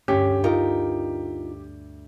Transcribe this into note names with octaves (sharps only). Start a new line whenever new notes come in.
D2 G2 C#4 G4
D#4 F4 A#4